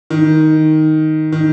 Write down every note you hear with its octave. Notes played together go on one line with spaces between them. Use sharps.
D#3
D#3